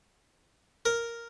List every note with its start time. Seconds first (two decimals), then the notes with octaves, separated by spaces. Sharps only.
0.85 A#4